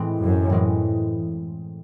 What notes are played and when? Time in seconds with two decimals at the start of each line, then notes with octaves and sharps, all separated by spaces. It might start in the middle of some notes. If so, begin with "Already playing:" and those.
Already playing: A2 E3 G#3 C4
0.22 F#2
0.50 A2 E3 G#3 C4